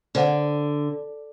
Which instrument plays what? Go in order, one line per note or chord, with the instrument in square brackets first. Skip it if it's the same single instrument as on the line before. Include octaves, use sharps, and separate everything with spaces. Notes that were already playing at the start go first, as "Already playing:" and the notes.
[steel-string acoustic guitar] D3 [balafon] A#4 C5 F#5